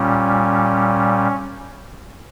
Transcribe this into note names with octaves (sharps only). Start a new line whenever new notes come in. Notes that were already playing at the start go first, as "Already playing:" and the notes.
Already playing: A#2 G3 C#4